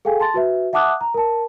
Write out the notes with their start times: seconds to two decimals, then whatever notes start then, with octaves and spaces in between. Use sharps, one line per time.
0.05 G#4 A4 F5 G5 G#5
0.20 A5 C6 A6
0.34 F#4 B4 E5
0.73 E5 F#5 A5 D6 D#6 F#6
1.01 A#5
1.14 A#4 A5